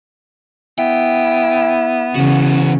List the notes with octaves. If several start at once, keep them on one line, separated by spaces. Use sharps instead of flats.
B3 E4 G5
C#3 E3 F#4